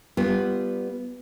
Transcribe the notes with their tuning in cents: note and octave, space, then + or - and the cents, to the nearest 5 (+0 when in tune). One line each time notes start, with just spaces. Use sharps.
G3 +0 B3 +0 F4 -15